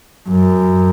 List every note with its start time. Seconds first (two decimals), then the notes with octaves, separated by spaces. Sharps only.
0.29 F#2